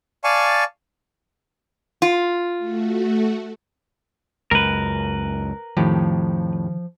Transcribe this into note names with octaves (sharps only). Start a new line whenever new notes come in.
D5 F5 G#5 A5 C#6
F4
A3 F#4
C#2 F#2 A#4 B4
F2 A2 D#3 F3 G4